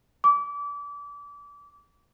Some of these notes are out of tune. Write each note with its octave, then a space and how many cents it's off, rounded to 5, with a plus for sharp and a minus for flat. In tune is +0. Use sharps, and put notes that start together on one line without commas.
D6 -30